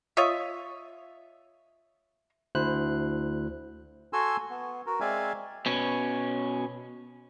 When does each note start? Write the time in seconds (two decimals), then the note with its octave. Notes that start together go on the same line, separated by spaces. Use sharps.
0.17 F4 C#5 D#5 E5
2.55 D2 E4 C5 F#6
4.13 F#4 A4 G#5 C6 E6
4.50 B3
4.86 F#4 A#4
5.00 G#3 C4 D5 E5 F5 G#5
5.66 B2 C#4